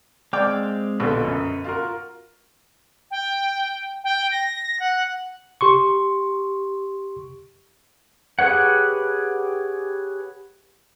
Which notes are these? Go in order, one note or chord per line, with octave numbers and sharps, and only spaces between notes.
G#3 C4 D5 F5 G5 D6
A#1 B2 D3 F4 B4 D#5
F#2
F4 F#4 A#4
G5
G5
A#6
F#5
G4 C6 C#6
G4 G#4 B4 C#5 F#5